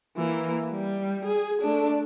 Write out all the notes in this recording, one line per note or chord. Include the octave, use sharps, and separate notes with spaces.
E3 A#3
G3
G#4
A3 D4